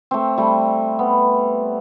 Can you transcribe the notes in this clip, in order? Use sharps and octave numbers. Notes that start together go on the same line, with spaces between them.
A3 C4
G3 A3
B3